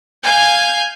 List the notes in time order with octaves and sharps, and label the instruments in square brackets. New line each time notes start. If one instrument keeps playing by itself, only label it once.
[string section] F5 G#5 G6